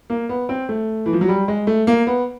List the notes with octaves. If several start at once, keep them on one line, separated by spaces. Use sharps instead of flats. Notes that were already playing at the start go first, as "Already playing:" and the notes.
A#3
B3
C4
A3
E3
F3
F#3
G3
G#3
A3
A#3
B3